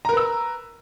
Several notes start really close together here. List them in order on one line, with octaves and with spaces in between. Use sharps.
A#5 A#4 B4 E6